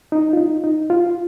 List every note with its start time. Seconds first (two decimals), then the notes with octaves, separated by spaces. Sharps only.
0.12 D#4
0.33 F4
0.37 D#4
0.64 D#4
0.90 F4